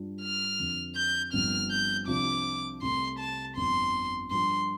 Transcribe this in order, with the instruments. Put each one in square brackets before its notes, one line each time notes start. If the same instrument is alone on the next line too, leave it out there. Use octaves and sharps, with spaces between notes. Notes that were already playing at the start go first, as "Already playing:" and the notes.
Already playing: [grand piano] G2 G3 D4 F4
[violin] F6
[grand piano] F2 D3 F3
[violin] G6
[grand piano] G1 G2 F3 C4 [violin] F6
[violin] G6
[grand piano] C2 C3 F3 D4 F4 [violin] D6
[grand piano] C2 C3 A3 [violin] C6
[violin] A5
[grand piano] G1 F2 F3 [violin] C6
[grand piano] G2 F3 D4 F4 [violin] C6